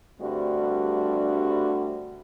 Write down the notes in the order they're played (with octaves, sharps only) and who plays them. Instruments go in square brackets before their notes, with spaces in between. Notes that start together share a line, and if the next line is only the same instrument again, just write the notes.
[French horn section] G2 D3 G3 A3 C4 F#4